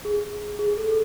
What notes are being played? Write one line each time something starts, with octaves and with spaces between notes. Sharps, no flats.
G#4
G#4
A4